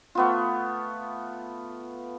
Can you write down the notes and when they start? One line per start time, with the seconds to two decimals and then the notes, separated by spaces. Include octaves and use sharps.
0.15 A3 B3 F4